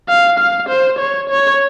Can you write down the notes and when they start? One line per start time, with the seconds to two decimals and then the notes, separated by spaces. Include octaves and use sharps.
0.09 F5
0.39 F5
0.69 C5
0.99 C#5
1.29 C#5